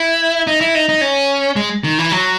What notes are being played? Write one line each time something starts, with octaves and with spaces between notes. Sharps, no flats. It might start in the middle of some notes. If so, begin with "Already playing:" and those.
Already playing: E4
D#4
E4
D#4
D#4
C#4
G#3
D#3
E3
F#3